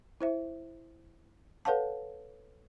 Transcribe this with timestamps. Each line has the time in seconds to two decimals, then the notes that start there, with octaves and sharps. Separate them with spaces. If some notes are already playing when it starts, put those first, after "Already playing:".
0.21 E4 C5 E5
1.65 A4 B4 C#5 F5 F#5 A5